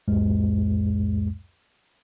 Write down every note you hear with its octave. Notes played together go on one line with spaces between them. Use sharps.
C2 F2 A2 G#3